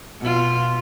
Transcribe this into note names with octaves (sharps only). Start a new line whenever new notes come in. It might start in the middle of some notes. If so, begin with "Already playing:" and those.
B2 F4